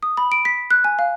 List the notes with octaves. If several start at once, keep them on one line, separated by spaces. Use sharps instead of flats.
D#6
B5
D7
B6
F#6
G#5
F5